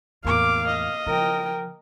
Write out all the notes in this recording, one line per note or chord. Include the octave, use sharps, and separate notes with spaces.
E2 A2 A#3 F5 D6
D#5
C#3 F3 A#4 G5